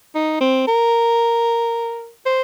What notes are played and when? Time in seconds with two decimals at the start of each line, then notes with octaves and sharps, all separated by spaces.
0.15 D#4
0.41 C4
0.67 A#4
2.25 C5